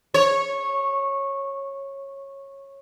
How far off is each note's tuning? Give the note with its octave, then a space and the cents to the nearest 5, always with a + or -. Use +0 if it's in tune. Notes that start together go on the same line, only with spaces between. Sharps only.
C#5 -15